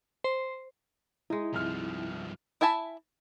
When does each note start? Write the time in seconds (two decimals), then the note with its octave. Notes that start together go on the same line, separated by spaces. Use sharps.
0.24 C5
1.30 G#3 D#4 E4
1.54 C2 G2 F3 F6
2.61 E4 E5 G#5 A5 B5